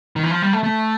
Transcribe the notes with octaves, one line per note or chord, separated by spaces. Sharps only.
D#3
E3
F3
G3
A3
A3